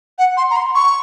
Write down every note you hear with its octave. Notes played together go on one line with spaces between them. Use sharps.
F#5
C6
A#5
C6
C#6